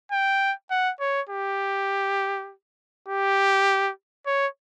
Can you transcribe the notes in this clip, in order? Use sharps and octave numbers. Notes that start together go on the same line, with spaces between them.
G5
F#5
C#5
G4
G4
C#5